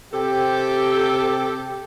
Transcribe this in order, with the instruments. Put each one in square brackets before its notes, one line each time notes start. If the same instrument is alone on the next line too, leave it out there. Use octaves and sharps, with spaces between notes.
[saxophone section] C3 A4 [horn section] G4 G5